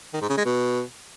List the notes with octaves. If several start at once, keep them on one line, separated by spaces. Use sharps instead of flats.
D#3
G#2
C#3
G#3
B2